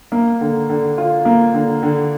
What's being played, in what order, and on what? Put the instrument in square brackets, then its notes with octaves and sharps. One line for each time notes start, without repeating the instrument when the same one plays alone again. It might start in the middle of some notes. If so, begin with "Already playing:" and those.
[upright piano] A#3
D3
D3
F4
A#3
D3
D3